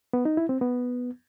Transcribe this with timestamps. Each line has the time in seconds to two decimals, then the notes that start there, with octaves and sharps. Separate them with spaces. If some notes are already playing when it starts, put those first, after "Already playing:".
0.13 B3
0.25 D#4
0.37 E4
0.49 C4
0.61 B3